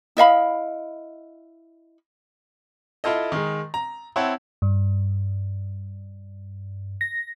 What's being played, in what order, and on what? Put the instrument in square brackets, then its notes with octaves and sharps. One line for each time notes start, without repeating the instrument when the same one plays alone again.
[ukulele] E4 D#5 F5 B5
[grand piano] E4 F4 A4 D#5
D#3 G#3
A#5
C4 E4 C#5 F#5 A5
[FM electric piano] G2
A#6